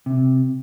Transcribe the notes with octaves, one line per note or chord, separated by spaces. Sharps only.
C3